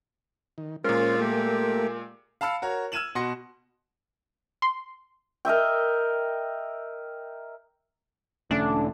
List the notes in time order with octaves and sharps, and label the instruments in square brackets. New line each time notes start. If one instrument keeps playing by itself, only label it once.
[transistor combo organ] D#3
[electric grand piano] A#2 G#3 [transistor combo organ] C#4 C5 [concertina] F4 [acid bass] A#4
[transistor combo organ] A3 A#3 [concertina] G4
[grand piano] F5 A5 B5 E6 F6 C#7
F#4 A#4 C#5
E6 F6 G#6 D#7 E7 F#7
B2 F#4 C6 A#6 C#7
[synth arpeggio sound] C6
[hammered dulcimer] A#4 D#5 E5 G5
[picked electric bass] E1 A3 C#4 [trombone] D3 [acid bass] D4